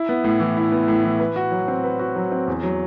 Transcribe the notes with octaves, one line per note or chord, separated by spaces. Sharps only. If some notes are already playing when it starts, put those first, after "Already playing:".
Already playing: E4
B3
A2
E3
E4
B3
A2
E3
B4
F#4
F#3
C4
B4
F#4
F#3
C4
E2
F#3